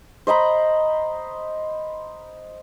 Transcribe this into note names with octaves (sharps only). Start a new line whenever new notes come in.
C5 D#5 A#5 B5